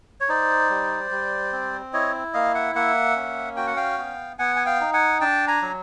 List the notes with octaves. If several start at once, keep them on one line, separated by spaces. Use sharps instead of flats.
C#5
D#4 C5 D5
G3
G3
C4
E4 C#5 D#5
A#3 D#5 F5
E5 F#5
A#3 E5 F#5
C#4
F#4 G5
F#5
F5 G5
B3
B3 F#5 G#5
G#5
F5 G5
D#4
F#5 G#5
D4 G5 A5
G#5 A#5
F#3